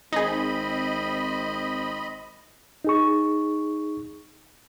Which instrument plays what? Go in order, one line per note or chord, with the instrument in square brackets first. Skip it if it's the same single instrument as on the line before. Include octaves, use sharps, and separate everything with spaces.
[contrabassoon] G#1 [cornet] C4 [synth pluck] D#4 G#4 [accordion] D#5 B5
[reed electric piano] D#4 G#4 C#6